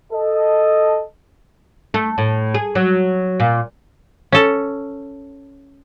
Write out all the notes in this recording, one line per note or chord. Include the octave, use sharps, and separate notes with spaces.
A4 D#5
A3
A2
G#4
F#3
A#2
C#4 A4